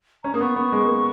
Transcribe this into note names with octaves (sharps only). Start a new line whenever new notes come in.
C#4 A#5
A#3 D#6
B3 C#6
B3 C#6
G#3
A#3